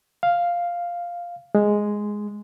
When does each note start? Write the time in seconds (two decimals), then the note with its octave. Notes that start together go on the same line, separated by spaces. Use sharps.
0.23 F5
1.55 G#3